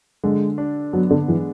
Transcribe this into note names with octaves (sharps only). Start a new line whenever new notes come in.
D3 G#3
D4
F#3 B3
D3
E3 G#3